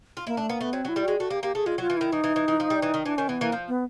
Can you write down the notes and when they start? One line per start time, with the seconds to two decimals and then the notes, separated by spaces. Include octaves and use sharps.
0.17 F4
0.27 A#3 E4
0.37 A3 D4
0.49 A#3 B3
0.61 A3 B3
0.73 F#3 C4
0.85 F#3
0.88 E4
0.96 G3
1.04 G#3 F#4
1.19 A3 F#4
1.30 A#3 G4
1.43 A#3 G4
1.55 A3 G#4
1.66 G#3 F4
1.78 F#3 F4
1.90 E3
1.97 D#3 E4
2.12 E3 D#4
2.24 E3
2.36 E3
2.48 E3
2.60 F3
2.70 G3
2.82 E3
2.94 D#3
3.05 E3 D4
3.18 D#3 C#4
3.28 E3 B3
3.41 E3 A#3
3.52 F3
3.68 B3